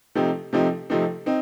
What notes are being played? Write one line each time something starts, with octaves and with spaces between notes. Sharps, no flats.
C3 F3 A3 C4 D#4
C3 F3 A3 C4 D#4
C3 F3 A3 C4 D#4
C4 D#4